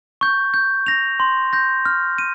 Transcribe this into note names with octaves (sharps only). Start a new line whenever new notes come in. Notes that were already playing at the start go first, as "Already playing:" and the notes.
C#6 G6
G6
A#6 F7
C6
G6 A#6
F6
D#7